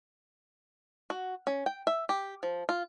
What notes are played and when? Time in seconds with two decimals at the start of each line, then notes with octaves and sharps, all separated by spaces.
1.10 F#4
1.47 C#4
1.66 G5
1.87 E5
2.09 G4
2.43 F3
2.69 F4